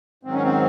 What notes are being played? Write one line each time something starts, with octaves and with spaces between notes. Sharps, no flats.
G#2 D#3 F#3 C4
C#4
C4